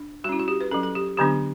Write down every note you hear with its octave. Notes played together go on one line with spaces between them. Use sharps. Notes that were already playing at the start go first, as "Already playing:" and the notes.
Already playing: D4
G3 C#4 E4 F#4
F#4
G4
B4
F#3 C#4 A4
A4
G4
D3 F#3 B3 D4 G4